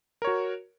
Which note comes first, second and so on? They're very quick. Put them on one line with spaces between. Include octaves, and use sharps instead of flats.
A#4 C#5 F#4